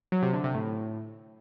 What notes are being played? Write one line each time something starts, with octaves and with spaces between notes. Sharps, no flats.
F#3
C3
D3
C3
A2